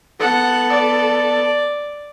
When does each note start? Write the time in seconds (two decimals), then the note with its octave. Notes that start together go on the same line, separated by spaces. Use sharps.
0.20 B3 A4 F#5
0.72 D5